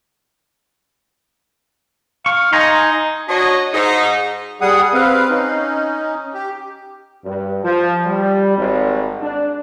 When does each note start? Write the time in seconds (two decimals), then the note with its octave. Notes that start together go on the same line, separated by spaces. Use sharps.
2.26 F5 C#6
2.53 D#4 G#5 A#5 C6
3.29 D4 F#4 C#5 D#5
3.74 G#2 D#4
4.61 G3 G#4 F#5 D#6
4.94 C4 B4 F5
5.30 C#4 D#4
6.34 G4
7.25 G2
7.63 F3
8.05 G3
8.56 G#1
9.22 D4